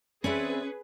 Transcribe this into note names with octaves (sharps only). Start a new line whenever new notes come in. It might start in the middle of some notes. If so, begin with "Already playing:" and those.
C4 C#4 G#4 B4 D5 E5